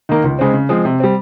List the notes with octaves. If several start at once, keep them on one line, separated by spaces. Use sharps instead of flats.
D#3 A#3
C#2
C#3 G#3 C4
C#3
F3 G#3 C4
C3
G3 C4